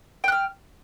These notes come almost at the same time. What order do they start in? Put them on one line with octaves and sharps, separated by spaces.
G5 F#6 F6